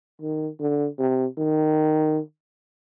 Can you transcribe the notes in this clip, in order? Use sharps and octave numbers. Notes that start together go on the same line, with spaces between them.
D#3
D3
C3
D#3